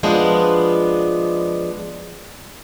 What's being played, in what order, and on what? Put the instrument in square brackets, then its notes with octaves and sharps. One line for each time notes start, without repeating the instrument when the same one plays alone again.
[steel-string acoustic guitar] F3 G#3 B3 D4